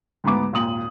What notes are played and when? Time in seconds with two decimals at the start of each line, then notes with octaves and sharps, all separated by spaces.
0.24 D2 G#2 B3 D6
0.53 G#1 D#2 A#2 D#6 F#7